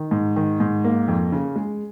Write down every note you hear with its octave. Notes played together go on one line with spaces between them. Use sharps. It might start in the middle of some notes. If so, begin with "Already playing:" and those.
Already playing: D#3
G#2
D#3
G#2
A#3
F2
C#3
G#3